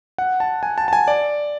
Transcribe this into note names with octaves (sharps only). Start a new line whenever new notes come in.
F#5
A5
G#5
A5
A5
G#5
D5